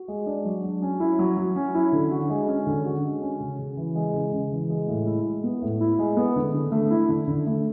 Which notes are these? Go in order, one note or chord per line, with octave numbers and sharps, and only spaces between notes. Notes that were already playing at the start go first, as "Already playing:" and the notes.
Already playing: F#4
G#3
D4
F#3
F#3
C#4
E4
F#3
F#3
C#4
E4
D3
F#4
G#3
C#4
D3
F#4
G#3
C#4
C#3
C#3
E3
G#3
C#3
C#3
E3
G#3
A2
E4
G#3
B3
A2
E4
G#3
B3
D3
D3
A3
E4
D3
D3
A3